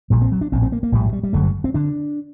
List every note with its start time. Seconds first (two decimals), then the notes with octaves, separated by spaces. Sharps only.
0.10 A#1 A#2 G3
0.22 C4
0.32 F#3
0.41 D4
0.52 A#1 A2 C4
0.63 C4
0.72 A#3
0.83 A#3
0.92 A#1 A2 G3
1.09 F#3
1.13 G3
1.23 G3
1.33 G1 F#2 D3 A3
1.43 G3
1.64 C4
1.74 D3 D4